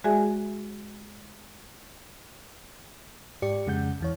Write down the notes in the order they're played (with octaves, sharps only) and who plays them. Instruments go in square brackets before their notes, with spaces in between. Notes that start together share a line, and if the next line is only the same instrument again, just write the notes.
[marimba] G#3 F#4 G#4 D5 E5 G#5
[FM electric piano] G#2 G4 D5 C#7
F2 C#3 G#3 F#5 G6
E2 E3 C#5